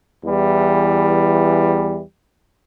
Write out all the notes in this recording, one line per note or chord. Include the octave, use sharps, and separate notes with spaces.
E2 E3 G3